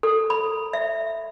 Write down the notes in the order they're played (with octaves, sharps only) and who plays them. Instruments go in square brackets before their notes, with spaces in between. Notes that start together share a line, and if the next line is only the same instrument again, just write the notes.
[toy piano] A4
B5
E5